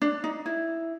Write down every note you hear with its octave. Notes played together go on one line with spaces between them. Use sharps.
D4
D#4
E4